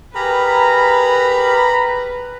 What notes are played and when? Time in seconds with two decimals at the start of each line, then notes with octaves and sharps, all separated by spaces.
0.15 G4 G#4 A#4 B4 A#5 B5